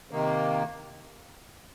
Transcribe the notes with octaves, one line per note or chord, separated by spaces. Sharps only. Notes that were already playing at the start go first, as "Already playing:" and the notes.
C3 D#3 A#3